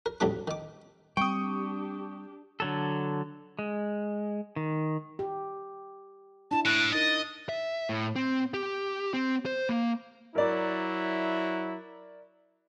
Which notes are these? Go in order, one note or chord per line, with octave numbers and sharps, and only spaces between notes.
A#4
A1 D2 F#3 G3 D4 D6
D#3 D6
G3 C4 D4 G4 G5 C#6 D#6
D3 F#3 A4
G#3
D#3
G4
D4 E4 A5
A2 F#6
D#4 A#4 D#5 A6
E5
A2
C4
G4
C4
C5
A#3
F#3 E4 A#4 D5